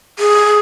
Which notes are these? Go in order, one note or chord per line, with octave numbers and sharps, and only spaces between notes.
G#4